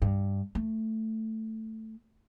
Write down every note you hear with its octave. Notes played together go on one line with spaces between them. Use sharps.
G2
A3